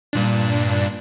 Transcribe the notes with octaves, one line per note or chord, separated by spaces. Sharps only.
G2 A#2 D4